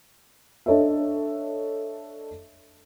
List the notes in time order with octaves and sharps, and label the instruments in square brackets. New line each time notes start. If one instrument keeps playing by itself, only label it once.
[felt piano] D4 A4 C#5 D#5 E5